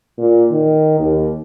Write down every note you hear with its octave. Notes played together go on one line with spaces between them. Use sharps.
A#2
D#3
D#2